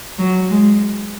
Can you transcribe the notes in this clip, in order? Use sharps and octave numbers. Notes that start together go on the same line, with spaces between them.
F#3
G#3